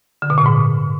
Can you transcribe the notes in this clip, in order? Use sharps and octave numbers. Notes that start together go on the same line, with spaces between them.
D3
B2
A#2
G#2